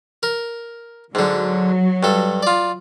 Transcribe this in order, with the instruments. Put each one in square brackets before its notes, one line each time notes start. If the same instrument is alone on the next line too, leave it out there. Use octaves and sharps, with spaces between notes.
[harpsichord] A#4
[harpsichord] G#2 D3 [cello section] F#3
[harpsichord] G2 A4
F4 D5